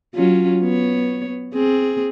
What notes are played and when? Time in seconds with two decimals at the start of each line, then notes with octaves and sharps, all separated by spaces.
0.15 F#3 C#4 F4
0.61 B3 C#5
1.54 C4 G#4